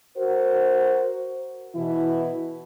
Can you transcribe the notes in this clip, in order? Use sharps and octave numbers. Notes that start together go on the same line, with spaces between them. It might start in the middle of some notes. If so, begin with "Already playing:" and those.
F#4 A#4 C5
B2 E3 E4